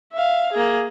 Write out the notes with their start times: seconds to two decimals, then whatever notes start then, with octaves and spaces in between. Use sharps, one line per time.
0.13 E5 F5
0.53 A#3 G#4